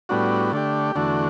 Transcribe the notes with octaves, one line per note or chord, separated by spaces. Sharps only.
A2 G3 B3 D4 F#4
D3 A3 D4 G4
E2 D3 A3 D4 F#4